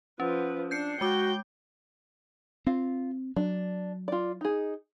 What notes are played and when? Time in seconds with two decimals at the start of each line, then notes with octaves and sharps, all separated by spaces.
0.20 F3 C#4 B4
0.71 D4 G6 C7 C#7
1.01 G#3 F#4 G5 D6
2.67 C4 F4
3.36 F#3 D4
4.08 F4 D5
4.41 D#4 G#4